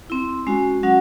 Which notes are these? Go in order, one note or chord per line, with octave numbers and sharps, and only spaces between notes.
C4 E4
G#3 C#4 F#4 G#5
F#3 C#4 F#4 F#5